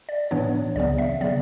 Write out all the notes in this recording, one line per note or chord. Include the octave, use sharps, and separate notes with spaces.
D5
A2 E3 B3 D4 C#5
C#2 C#3 F#3 B3 D5
E5
C#3 F#3 B3 D5